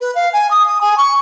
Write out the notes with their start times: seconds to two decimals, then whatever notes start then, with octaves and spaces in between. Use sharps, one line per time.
0.01 B4
0.15 F5
0.33 G#5
0.51 D#6
0.68 D#6
0.81 G#5
0.98 C#6